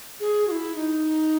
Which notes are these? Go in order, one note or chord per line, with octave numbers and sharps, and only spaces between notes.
G#4
F#4
E4
D#4